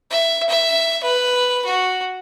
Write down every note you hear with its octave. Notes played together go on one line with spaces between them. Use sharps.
E5
E5
B4
F#4